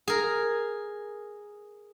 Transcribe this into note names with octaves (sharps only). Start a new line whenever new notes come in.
G#4 A#4